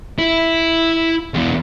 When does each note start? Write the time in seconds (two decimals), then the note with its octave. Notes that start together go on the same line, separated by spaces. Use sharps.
0.19 E4
1.34 E2 B2